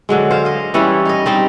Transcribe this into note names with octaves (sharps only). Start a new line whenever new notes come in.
D3 F#3 G#3
C5 F5
D#5 F5
E3 G3 C#4 E4
D#4 D#5
G3 C4 D#4